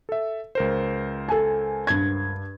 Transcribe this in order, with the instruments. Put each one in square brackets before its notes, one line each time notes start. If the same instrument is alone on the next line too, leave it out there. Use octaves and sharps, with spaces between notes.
[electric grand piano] A4 E5
C#2 A#4 C5
[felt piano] A4 G#5
G2 G#6